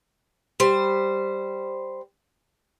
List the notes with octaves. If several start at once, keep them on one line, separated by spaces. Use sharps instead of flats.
G3 C5